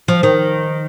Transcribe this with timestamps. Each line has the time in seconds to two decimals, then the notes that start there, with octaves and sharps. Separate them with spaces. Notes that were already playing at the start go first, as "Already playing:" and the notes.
0.08 F3
0.23 D#3